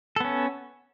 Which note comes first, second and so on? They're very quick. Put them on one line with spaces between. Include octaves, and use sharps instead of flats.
A4 B3 C#4